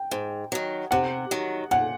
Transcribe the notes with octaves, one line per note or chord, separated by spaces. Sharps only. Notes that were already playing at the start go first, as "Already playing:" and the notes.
Already playing: G5
G#2
D#3 F#3
C3 F#5
D#3 F#3
A#2 F#5